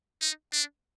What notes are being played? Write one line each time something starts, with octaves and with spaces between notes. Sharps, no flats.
D#4
D4